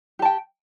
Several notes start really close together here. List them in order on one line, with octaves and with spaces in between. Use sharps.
G4 A5 G5